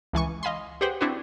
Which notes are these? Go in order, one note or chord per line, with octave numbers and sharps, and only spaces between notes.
C#2 E3 G#5 C#6
D#5 F5 G#5 B5 C6
G4 G#4 B4 C5 F#5 G5
C4 D4 E4 F#4 B4